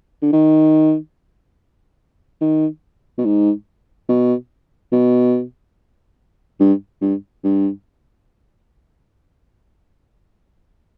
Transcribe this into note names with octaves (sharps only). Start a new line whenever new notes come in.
D3
D#3
D#3
B2
G#2
B2
B2
G2
G2
G2